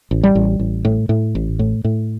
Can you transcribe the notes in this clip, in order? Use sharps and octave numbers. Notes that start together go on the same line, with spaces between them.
A1
G3
A1
A1
A2
A2
A1
A2
A2